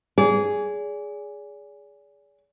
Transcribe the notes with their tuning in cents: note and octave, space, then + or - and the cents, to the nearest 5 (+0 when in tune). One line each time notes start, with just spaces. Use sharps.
G#4 +0 D5 -35